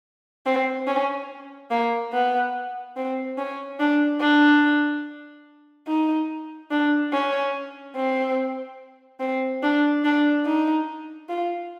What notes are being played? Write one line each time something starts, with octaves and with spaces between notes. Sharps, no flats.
C4
C#4
A#3
B3
C4
C#4
D4
D4
D#4
D4
C#4
C4
C4
D4
D4
D#4
F4